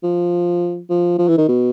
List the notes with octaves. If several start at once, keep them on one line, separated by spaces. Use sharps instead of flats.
F3
F3
F3
E3
D#3
B2